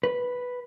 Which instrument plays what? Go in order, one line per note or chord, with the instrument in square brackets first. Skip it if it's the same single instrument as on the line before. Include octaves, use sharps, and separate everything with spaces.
[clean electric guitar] B4